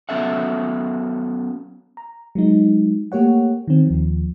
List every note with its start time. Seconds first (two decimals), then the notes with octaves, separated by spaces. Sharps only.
0.09 F#3 B3 C#4 A4 E5 F#5
1.97 A#5
2.35 F#3 G#3 D#4
3.12 A3 A#3 G4 C#5 F#5
3.68 D#3 C4
3.87 D#2 F3